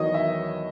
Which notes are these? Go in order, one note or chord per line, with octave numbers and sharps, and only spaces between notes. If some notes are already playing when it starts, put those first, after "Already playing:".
Already playing: E2 D#3 F#3 C#5 D#5
E5